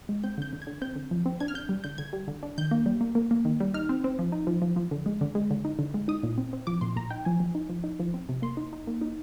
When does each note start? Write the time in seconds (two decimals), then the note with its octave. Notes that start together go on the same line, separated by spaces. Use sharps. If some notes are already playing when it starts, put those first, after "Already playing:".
0.09 G#3
0.23 C4 G6
0.38 D3 G6
0.53 D3
0.62 G#6
0.67 D3
0.82 C4 G6
0.96 D3
1.11 F3
1.26 C4
1.40 D4 G#6
1.48 F6
1.54 D3 G6
1.69 G3
1.84 D3 G6
1.98 D3 G#6
2.13 G3
2.28 D3
2.43 D4
2.58 D#3 G6
2.71 A#3
2.86 G3
3.01 A#3
3.15 A#3
3.31 A#3
3.45 D#3
3.60 G3
3.74 D#4 F6
3.89 C4
4.04 C4
4.19 F3
4.32 D#4
4.47 F3
4.62 F3
4.76 F3
4.91 D3
5.06 G#3
5.21 D3
5.35 G#3
5.51 D3
5.65 D#4
5.79 D3
5.94 G#3
6.08 D#4 D#6
6.23 A#2
6.38 C4
6.53 C4
6.67 F3 D6
6.81 A#2 C6
6.96 A#2 A#5
7.11 D#4 G5
7.25 F3 G#5
7.40 F3
7.55 D#4
7.69 F3
7.84 D#4
8.00 F3
8.14 C4
8.29 C3
8.42 A#3 C6
8.57 D#4
8.73 D#4
8.87 A#3
9.01 D#4